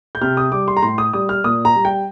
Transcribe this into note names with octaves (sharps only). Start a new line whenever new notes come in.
G6
C3 F6
D#6
G3 D6
C6
A#5
A2 C6
D#6
G3 D#6
F6
A#2 D#6
A#5
G3
G5